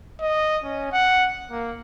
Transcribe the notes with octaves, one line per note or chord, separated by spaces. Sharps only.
D#5
C#4
F#5
A#3